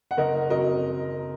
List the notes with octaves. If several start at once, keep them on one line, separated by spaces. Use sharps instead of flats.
F#5
F#1 A#4 D#5
F#2 F#3 A#4 D#5